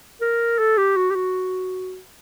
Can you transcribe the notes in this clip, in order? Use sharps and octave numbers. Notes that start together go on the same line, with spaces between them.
A#4
A4
G4
F#4
G4
F#4